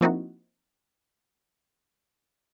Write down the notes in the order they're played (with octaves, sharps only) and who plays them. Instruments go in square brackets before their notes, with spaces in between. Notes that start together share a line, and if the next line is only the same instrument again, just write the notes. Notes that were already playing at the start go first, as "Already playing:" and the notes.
[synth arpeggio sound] F3 A#3 C4 D#4 E4 F#4